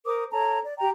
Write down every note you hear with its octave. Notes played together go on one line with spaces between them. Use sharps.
A#4 C5 D6 D#6
A4 C#5 A5 A#5
D5
G4 G5 A#5